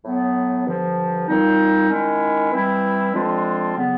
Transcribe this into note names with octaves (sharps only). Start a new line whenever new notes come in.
A2 F#3 B3
G2 D3 F3
A#2 G3 C4 D#4
D#3 G#3 C#4 E4
E3 G3 C4 E4
D3 F3 G#3 C4 F4
C#3 F#3 B3